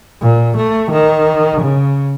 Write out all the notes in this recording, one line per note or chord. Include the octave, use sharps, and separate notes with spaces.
A#2
A3
D#3
C#3